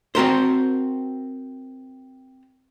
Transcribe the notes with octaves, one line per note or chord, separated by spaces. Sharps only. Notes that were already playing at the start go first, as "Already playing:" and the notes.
C4 F#4 A#4 C5